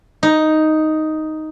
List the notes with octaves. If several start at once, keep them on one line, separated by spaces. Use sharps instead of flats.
D#4